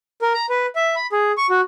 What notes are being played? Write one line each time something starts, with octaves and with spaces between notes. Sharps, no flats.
A#4
A#5
B4
E5
B5
G#4
C#6
F#4